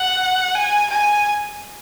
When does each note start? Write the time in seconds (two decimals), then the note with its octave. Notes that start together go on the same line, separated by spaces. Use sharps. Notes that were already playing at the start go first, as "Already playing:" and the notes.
Already playing: F#5
0.55 G#5
0.90 G#5